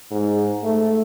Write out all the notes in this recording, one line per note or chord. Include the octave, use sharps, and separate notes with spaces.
G#2
A3